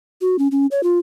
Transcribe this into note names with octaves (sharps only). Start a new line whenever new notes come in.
F#4
C#4
C#4
C#5
F4